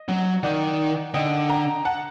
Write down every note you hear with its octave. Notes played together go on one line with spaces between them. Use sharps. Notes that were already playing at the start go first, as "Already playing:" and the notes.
Already playing: D#5
F#3
D#3 D5 F#5
D3 D#5 G5
G5 A#5
F#5 A5